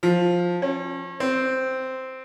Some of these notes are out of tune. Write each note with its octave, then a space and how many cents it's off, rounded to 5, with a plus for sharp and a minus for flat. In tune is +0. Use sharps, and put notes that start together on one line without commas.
F3 +10
C#4 -35
C4 -5